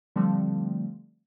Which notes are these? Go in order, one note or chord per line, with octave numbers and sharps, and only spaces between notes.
D3 F3 G3 A3 C4